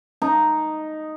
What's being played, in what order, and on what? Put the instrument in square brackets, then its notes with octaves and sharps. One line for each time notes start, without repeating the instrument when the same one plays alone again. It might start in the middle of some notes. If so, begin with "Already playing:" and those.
[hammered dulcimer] D#4